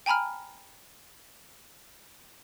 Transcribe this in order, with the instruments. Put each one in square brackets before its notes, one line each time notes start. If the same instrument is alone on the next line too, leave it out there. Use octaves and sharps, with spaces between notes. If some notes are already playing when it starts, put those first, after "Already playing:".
[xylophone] G5 G#5 A#5 B5 F6